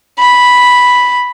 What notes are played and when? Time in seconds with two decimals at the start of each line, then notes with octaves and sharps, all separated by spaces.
0.19 B5